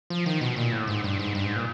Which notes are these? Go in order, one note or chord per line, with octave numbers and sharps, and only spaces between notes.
F3
D#3
B2
A#2
A2
G#2
G2
G#2
G2
G#2
A#2